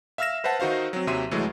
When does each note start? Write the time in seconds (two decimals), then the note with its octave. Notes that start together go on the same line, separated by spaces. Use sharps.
0.18 E5 F5 E6 F6 A#6 E7
0.44 B4 C5 E5 F#5 A5
0.60 D#3 D#4 F#4 C5 F5
0.93 F#3 C4
1.07 D#2 C3 F#3 E5 C6 D#7
1.31 C2 E3 F#3 G#3 A3